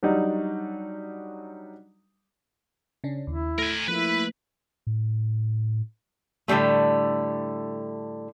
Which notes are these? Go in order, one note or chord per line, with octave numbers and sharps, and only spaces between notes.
F#3 G3 D4 D#4
C#3 C#4 D4
D#2 E4
A3 A#4 G#5
F3 A3 A#3 E4 B4
A2
A2 D3 E3 G3 A3